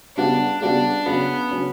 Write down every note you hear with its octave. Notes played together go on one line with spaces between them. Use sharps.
C#3 G3 B3 D4 F#4
C#3 G3 B3 D4 F#4
C#3 F#3 B3 C#4
C#3 F#3 C#4